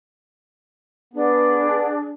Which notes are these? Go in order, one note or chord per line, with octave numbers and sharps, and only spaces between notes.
B3 D4 G#4